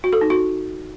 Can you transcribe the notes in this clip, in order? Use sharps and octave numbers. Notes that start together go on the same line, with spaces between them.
F#4
A4
D#4
F#4